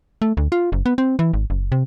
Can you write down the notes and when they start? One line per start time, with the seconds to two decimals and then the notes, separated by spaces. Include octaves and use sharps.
0.22 A3
0.37 D2
0.52 F4
0.72 F#1
0.86 B3
0.98 C4
1.19 E3
1.33 G#1
1.50 F#1
1.72 C3